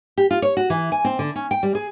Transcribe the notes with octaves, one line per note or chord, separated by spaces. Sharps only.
G4
F4
C#5
F#4
E3
G#5
C4
D3
C#4
G5
G3
G#4